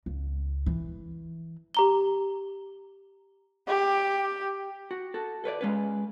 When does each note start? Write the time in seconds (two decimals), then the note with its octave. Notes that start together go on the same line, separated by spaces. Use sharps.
0.06 C#2
0.66 E3
1.75 G4 A#5 G7
3.68 G4
4.91 F#4
5.14 F#4 A4
5.44 A4 B4 C#5 D5
5.61 G#3 C#4 B4